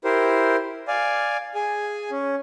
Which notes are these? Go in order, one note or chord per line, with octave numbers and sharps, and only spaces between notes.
E4 G4 A#4 C5
D5 F5 G#5
G#4 G#5
C#4